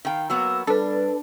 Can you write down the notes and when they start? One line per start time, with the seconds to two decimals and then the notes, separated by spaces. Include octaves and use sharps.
0.05 D#3 F5 G5
0.30 F#3 A#3 B3 E6
0.67 G3 D4 A4 B4